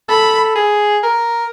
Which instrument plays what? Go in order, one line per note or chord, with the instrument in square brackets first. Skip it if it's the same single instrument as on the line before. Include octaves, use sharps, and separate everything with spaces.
[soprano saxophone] A4 [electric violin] B5
[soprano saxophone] G#4
A#4